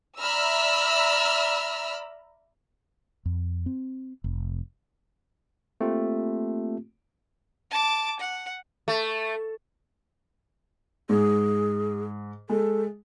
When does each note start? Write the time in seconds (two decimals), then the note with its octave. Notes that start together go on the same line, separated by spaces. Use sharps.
0.20 D5 E5 A#5 B5 E6 F6
3.25 F2
3.66 C4
4.24 F1
5.81 A3 A#3 C4 F4 G4
7.71 A5 D6
8.20 F#5
8.88 A3
11.09 G#2 G#4
12.49 G#3 A4